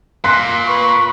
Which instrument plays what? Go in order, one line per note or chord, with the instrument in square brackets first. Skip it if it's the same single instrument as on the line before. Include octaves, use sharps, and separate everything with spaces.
[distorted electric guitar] A#2 [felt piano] C6 F#6
[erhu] B4 [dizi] C#6